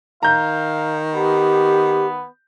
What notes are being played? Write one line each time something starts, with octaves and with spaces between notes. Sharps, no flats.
D#3 F5 A#5 G6
B3 G4